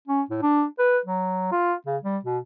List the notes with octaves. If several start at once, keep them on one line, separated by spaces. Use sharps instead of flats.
C#4
A2
D4
B4
F#3
F4
C#3
G3
B2